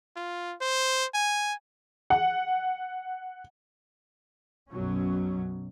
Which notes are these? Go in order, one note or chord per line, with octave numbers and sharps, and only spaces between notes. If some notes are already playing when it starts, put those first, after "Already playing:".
F4
C5
G#5
F#5
B1 F#2 B2 F#3 C#4